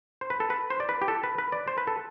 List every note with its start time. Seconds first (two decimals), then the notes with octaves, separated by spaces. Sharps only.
0.21 C5
0.30 B4
0.40 A4
0.50 B4
0.70 C5
0.80 D5
0.89 B4
1.02 G4
1.08 A4
1.23 B4
1.38 B4
1.52 D5
1.68 C5
1.78 B4
1.87 A4